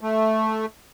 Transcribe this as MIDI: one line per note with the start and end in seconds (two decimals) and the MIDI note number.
0.01 0.66 57